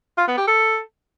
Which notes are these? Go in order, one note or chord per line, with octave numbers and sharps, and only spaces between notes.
F4
B3
G4
A4